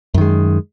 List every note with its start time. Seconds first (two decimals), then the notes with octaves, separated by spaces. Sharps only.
0.14 F#2
0.18 D#3
0.21 G#3